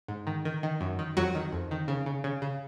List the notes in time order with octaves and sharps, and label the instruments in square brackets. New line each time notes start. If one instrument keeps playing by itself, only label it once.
[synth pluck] G#2
D#3
D#3
D#3
F#2
D#3
F2 F#3 F#4
D#3
F2
D#3
C#3
C#3
C#3
C#3